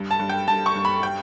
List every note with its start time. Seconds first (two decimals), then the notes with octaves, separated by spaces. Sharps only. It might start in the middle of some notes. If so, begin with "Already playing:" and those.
Already playing: G2
0.11 A5
0.19 G2
0.29 G5
0.48 G2 A5
0.66 C#6
0.75 G2
0.85 B5
1.03 G5